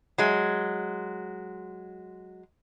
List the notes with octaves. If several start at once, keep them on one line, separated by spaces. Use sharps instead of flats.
F#3 G#3